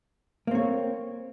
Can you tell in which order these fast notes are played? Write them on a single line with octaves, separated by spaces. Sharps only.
A#3 C4 C#5